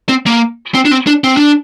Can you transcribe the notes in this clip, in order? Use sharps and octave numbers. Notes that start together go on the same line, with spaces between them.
C4
A#3
C4
D4
C4
D4
C4
D4